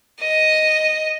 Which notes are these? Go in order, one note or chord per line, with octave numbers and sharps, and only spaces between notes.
D#5